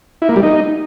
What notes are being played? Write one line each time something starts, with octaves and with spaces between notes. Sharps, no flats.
E4
A#3
G3
D#4